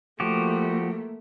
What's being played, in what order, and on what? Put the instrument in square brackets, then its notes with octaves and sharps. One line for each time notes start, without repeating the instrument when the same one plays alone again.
[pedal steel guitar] F3 F#4 G4 [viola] A3 A#3